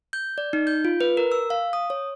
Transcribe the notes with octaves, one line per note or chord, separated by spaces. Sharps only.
G6
D5
D#4
G6
F4
B4
A#4
E6
F5
D#6
C#5